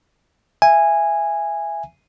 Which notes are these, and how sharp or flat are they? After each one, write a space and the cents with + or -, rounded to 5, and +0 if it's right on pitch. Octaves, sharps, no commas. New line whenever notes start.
E5 +20 G#5 -10